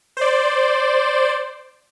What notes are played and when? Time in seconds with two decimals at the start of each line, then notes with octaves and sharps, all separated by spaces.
0.17 C5 D5